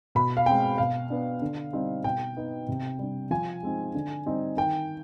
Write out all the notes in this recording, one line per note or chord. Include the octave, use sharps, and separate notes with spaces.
B2 B5
F5
G#3 C4 G5
B2 F5
B3 D4
D3
G3 C4 D#4
B2 G5
B3 D#4
C3
G3 D4
F3 G#5
G#3 C4 D#4
D3
G3 C4 D#4
D#3 G5